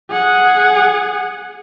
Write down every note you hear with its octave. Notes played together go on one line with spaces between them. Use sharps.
G#4 F#5